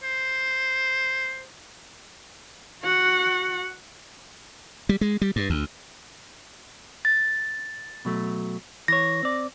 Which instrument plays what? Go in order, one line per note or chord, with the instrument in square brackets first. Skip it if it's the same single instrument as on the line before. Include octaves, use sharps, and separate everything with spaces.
[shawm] C5
[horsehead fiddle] F#4 F#5
[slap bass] G3
G#3
G3
G2
D2
[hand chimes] A6
[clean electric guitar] B2 F#3 A3
[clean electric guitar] E3 C#5 [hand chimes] A#6
[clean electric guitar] C4 D5